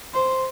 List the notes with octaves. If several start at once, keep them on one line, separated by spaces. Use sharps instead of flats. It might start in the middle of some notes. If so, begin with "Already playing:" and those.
C5